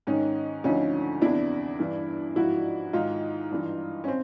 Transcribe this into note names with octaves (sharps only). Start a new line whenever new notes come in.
G#2 D#3 C#4 D#4
D2 D3 F3 C#4 D#4
E2 C3 E3 D4 E4
G2 E3
G#2 F3 E4 F#4
G#2 D#3 D#4 F4
G2 E3
C#4
C4